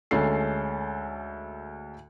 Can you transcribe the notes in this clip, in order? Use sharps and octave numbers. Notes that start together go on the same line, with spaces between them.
D2 G#3 C#4 A4 C7